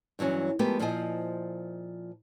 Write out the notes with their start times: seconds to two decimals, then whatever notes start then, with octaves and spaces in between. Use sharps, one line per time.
0.19 G2 E3 F#3 C#4
0.59 F3 G#3 A3 B3 G4 A#4
0.79 A#2 F3 E4 C5 D#5 G#5